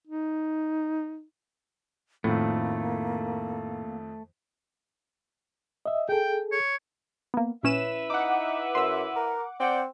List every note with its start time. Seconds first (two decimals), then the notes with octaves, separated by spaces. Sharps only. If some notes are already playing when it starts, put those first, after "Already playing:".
0.07 D#4
2.24 F2 A2 D#3 A3 A#3
5.86 D#5 E5
6.09 G#4 A4 G5
6.52 C#5
7.34 A#3 B3
7.63 A#1 C#4 E4 B4 E5 E7
8.10 D#4 F#5 D6
8.75 F#2 C6 E6
9.16 A#4
9.60 C4 D5 F#5 G5